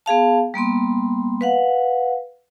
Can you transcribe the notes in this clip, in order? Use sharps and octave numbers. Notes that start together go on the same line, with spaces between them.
B3 G#4 F5 A5
G3 A#3 B3 C6
B4 F5 F#5